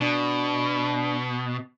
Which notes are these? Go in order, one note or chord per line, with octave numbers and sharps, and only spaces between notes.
B2 D4